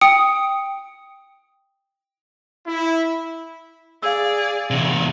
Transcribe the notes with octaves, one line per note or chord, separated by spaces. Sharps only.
G5 D#6 C#7
E4
G#4 D5 F5 E6
E2 C3